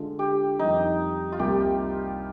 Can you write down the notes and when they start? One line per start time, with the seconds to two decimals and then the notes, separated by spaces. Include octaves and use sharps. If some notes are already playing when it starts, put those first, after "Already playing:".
Already playing: D3 G#3 D4 F4
0.19 G4
0.59 F2 D#3 G3 D#4
1.32 F4
1.39 C2 C3 G3 A#3 G4